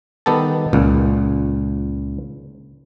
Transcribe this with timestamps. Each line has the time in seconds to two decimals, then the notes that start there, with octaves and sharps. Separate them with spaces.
0.26 D#3 G3 B3 G4 A4 A5
0.73 C#2 A#2